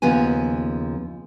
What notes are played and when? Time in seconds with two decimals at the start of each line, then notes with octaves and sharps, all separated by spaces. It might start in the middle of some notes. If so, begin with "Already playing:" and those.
0.02 D#2 C#3 F3 B3 G#5